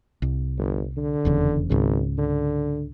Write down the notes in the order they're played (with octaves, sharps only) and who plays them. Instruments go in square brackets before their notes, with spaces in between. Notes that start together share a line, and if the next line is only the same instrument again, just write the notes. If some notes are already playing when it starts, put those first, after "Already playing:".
[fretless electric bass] C2
[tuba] G1
D3
[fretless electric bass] F1 E2 C#3
[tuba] G#1 [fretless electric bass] C#2 G#2 C#3
[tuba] D3